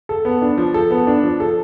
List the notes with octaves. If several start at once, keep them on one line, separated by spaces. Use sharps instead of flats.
A4
B3
D4
F3
A4
B3
D4
F3
A4